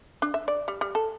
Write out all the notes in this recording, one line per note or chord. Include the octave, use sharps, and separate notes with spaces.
D4
E5
D5
G3
G3
A4